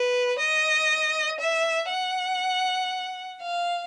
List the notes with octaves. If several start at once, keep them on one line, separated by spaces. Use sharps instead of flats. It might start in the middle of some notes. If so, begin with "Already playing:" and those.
Already playing: B4
D#5
E5
F#5
F5